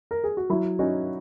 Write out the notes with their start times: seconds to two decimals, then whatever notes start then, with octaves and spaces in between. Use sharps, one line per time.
0.11 A#4
0.24 G#4
0.37 F#4
0.50 F#3 E4
0.79 C#4 D#4 F#4